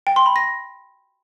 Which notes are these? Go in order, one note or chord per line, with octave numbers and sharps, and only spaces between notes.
G5
C6
B5
A#6